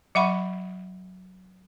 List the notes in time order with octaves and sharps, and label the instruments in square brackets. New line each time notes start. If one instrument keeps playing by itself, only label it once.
[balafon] F#3 E5 F#5 B5 C#6